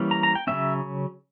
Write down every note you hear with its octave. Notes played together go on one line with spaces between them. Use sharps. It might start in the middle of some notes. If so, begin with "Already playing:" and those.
Already playing: E3 G3 A#3 C#4
A#5
A#5
G5
C#3 F#3 A#3 C#4 E5